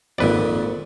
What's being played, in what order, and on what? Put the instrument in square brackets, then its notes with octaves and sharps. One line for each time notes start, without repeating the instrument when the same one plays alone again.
[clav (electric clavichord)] G#1 B4 D5 [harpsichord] F2 A#2